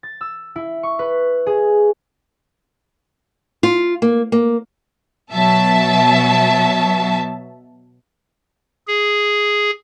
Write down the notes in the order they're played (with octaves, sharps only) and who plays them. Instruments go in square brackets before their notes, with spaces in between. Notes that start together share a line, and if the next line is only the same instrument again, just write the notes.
[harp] A6
E6
E4
C#6
B4
G#4
[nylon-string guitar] F4
A#3
A#3
[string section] B2 F#3 E5 A5
[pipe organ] G#4